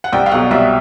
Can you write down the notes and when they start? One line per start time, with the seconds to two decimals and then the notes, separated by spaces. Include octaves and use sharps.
0.04 F#5
0.13 C2 G5
0.26 F5
0.31 B2 F#3 F#5
0.51 C2 E5